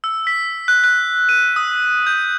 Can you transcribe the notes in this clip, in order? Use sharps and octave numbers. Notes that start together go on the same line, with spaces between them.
E6
B6
F#6
F#6
D#7
D#6
G6